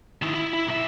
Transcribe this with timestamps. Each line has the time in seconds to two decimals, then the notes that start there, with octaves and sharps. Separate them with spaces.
0.22 D#3 E4
0.34 E4
0.53 E4
0.67 B1 E5